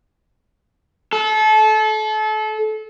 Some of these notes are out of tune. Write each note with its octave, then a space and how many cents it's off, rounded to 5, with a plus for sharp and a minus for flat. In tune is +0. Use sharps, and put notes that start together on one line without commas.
A4 -30